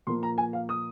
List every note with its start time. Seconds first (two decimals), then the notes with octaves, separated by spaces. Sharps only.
0.07 A#2 F3 A#3 C6
0.23 A#5
0.38 G#5
0.53 F5
0.69 D#6